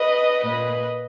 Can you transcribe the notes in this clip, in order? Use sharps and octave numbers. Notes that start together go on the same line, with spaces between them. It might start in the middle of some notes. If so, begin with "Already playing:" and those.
Already playing: B4 D#5
A#2 B4 D#5